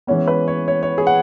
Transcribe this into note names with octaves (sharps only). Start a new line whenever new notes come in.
E3 G#3 B3 C#4
B4
C#5
C#5
C#5
G#4
F#5